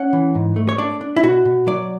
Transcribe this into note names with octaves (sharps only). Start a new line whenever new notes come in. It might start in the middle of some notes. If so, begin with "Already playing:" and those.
Already playing: C#4 F#5
E3
G#2
A3
C#5
D4 D5
D4
E4
B2 F#4
B2
F#3 D5